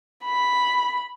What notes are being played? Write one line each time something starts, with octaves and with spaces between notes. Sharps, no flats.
B5